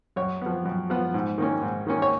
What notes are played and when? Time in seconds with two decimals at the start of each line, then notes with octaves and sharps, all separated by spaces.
0.16 F#2 C#5
0.42 F3 B3
0.65 F#2
0.90 F3 B3
1.14 G#2
1.38 D#3 A#3 C#4
1.62 G#2
1.87 D#3 A#3 C#4
2.02 C#5